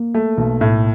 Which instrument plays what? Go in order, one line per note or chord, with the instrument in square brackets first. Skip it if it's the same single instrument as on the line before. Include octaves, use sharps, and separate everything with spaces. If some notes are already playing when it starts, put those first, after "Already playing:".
Already playing: [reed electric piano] A#3
[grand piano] A3
B1
A2